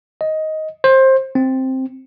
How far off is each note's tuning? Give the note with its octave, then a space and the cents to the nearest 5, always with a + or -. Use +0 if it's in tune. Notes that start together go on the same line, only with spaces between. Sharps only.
D#5 +10
C5 +20
C4 +5